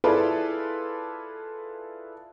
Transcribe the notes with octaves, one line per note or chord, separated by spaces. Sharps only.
E4 F4 G#4 A4 B4 D5